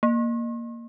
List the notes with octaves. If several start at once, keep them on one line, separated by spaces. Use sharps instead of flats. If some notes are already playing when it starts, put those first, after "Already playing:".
A#3